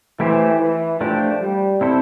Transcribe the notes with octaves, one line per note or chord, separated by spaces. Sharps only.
E3 A3 E4 G4 C5
E3
F3 A3 D4 G4 C5
G3
C4 E4 A4 C5